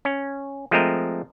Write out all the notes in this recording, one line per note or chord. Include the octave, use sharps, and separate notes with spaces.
C#4
F3 G#3 A3 C4 A#4 D#5